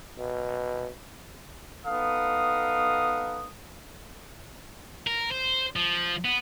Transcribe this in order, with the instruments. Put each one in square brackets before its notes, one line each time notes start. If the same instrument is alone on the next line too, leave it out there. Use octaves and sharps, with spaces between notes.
[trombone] B2
[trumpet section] B3 D#4 A4 F5 D#6
[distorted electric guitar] A#4
C5
F3
B3